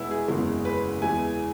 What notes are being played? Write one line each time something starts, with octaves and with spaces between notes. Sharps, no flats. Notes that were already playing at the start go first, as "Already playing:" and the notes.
Already playing: E2 B2 G#3 E4
G#4
F#1 E2 C#3 E3 G#3
B4
E2 E3 G#3 G#5